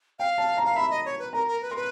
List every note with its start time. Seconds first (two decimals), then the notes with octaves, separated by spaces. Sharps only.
0.19 F5 G5
0.38 A5
0.57 A#5
0.65 F5
0.76 E5 B5
0.90 D#5
1.05 C#5
1.19 B4
1.33 A#4 A#5
1.48 A#4
1.62 B4
1.71 A#4 C6
1.76 B4